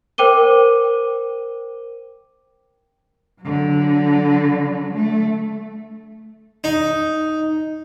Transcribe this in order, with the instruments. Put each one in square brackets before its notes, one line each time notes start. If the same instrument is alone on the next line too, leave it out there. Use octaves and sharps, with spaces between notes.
[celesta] A#4 C5 G5 D6 D#7 G7
[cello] D3 F#3
A3
[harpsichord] D#4